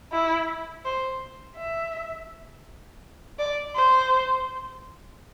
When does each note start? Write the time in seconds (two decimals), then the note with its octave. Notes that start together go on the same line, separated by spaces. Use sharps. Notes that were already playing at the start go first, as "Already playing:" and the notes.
0.12 E4
0.85 C5
1.57 E5
3.39 D5
3.75 C5